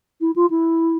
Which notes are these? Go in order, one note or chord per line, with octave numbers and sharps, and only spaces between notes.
E4
F4
E4